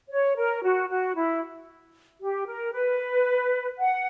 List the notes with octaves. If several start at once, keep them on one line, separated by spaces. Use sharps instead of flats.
C#5
A#4
F#4
F#4
E4
G4
A#4
B4
F#5